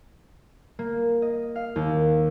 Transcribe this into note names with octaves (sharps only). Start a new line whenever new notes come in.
A#3
D#5
F5
D#2